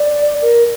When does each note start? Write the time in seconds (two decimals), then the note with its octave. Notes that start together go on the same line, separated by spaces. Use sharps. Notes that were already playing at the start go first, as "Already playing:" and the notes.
Already playing: D5
0.42 A#4